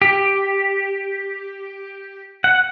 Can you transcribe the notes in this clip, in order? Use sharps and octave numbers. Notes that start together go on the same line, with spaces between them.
G4
F#5